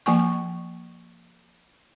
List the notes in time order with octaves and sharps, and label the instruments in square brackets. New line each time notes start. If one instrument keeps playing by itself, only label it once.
[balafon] F3 A#3 G#5 C#6